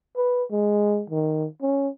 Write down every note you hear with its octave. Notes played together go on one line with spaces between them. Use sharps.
B4
G#3
D#3
C#4